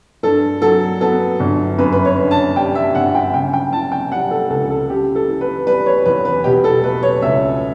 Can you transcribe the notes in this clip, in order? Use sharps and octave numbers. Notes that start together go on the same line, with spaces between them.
G2 A4
F#3 A4
B3 A4
G1
F#2 B4
B4
C#5
D3
A5
G3 G5
E5
G1 F#5
G5
C#3 G5
G5
E3 A5
G5
G3 F#5
A4
C#2 A4
A4
C#3 G4
A4
E3
B4
G3 B4
C#5
E2 B4
B4
B2 G4
A4
A3 B4
C#5
C#2 E5